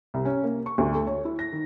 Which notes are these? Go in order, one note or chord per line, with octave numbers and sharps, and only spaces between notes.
C2
C#4
A#3
C#6
D2
A3
C#5
E4
A#6
D#3